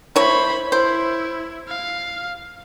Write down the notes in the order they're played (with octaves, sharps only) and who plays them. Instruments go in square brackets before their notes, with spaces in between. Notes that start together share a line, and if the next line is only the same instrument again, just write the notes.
[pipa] E4 C#5 [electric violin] C5 B5
[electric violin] E4 [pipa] C5
[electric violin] F5